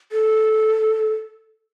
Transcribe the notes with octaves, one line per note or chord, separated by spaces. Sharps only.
A4